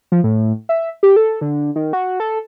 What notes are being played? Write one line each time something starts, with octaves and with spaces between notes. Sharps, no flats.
F3
A2
E5
G4
A4
D3
D#3
F#4
A4